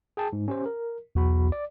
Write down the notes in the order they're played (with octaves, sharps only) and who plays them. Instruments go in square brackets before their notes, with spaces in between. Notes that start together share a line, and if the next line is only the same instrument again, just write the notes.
[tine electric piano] G#4 G5 A5
G#2
C#4 G4 C5
A#4
[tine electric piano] B1 F#4 B5 [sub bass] E2
[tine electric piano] D5